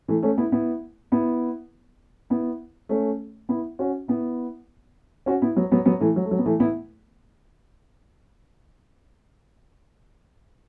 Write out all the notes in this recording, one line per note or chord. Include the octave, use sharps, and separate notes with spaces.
E3 A3
A3 C#4
B3 E4
B3 E4
B3 E4
B3 E4
A3 C#4
B3 E4
C#4 F#4
B3 E4
C#4 F#4
B3 E4
F#3 B3
F#3 B3
F#3 B3
E3 A3
F#3
A3
F#3
B3
E3 A3
B3 E4